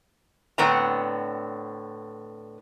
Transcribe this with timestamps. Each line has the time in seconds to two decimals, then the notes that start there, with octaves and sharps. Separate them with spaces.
0.58 A2 D3 B3 C4 D4 A#5